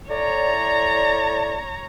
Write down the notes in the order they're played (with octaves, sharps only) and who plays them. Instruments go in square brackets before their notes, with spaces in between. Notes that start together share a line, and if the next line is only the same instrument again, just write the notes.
[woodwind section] A2 D5 [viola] C#5 A#5